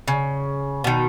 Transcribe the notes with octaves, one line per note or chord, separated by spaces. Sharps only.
C#3
B2 D#3